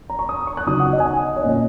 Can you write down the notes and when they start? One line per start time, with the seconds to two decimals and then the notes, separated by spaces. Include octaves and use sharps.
0.10 A#5
0.19 C#6
0.29 D#6
0.47 C#6
0.57 F#6
0.66 C#3 F#3 D#4 D#6
0.80 F#5
0.93 D#5
1.00 G#5
1.05 F#5
1.36 C#5
1.43 A#2 A#3 C#4 D#5